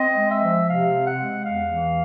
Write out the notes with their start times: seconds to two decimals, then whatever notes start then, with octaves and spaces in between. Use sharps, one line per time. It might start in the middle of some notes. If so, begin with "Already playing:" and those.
Already playing: C4 D#5
0.17 G#3
0.31 E5
0.43 F3
0.67 C3 F5
0.93 C4
1.06 F#5
1.19 G#3
1.44 E2 F5
1.70 E3